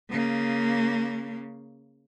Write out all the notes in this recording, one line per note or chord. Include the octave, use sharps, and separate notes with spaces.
C#3 A#3